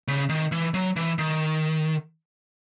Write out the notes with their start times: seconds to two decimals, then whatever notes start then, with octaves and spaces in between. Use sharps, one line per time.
0.08 C#3
0.29 D#3
0.52 E3
0.74 F#3
0.96 E3
1.19 D#3